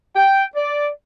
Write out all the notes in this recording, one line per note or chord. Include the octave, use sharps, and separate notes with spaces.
G5
D5